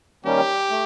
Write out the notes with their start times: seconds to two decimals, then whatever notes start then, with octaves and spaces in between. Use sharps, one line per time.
0.25 D#3 G3 A#3 C#4 G4
0.71 A3